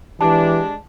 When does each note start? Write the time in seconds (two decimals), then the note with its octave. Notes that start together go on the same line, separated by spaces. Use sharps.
0.21 E3 G#3 D4 G4 A5